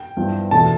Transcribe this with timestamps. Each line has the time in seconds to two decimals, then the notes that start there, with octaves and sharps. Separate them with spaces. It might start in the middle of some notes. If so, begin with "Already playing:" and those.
Already playing: G5
0.17 G2 F3 B3 E4
0.51 E2 B2 A3 D4 A5